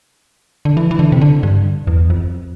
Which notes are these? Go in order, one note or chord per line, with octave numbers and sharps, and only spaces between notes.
D3
E3
E3
D3
C3
D3
G2
E2
F2